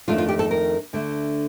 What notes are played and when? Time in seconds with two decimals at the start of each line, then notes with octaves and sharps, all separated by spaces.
0.08 F2 D#3 A3 D4 F4
0.18 F4
0.29 G4
0.39 A4
0.51 A#4
0.93 D2 D3 A3